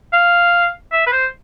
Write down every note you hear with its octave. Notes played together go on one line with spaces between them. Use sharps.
F5
E5
B4
C5